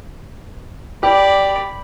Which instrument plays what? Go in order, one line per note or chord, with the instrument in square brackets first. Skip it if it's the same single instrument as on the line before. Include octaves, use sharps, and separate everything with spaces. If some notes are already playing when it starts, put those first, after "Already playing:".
[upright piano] G4 [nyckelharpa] D5 B5